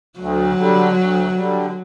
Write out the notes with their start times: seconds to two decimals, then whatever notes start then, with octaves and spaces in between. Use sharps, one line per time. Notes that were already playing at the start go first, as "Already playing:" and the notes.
0.19 D2 F#3
0.58 D3 G3
0.96 D2
1.36 D3 G3